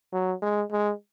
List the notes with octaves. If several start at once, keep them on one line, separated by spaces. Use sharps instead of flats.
F#3
G#3
G#3